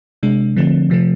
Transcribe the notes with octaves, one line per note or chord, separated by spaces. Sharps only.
C3 G#3 D4
D3 F3 A3 C4
C3 F3 A3